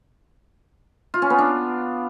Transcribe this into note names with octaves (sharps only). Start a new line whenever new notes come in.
F4
C#4
B3
D4